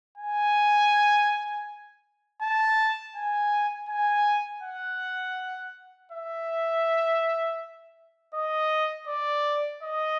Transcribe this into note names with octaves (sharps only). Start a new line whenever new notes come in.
G#5
A5
G#5
G#5
F#5
E5
D#5
D5
D#5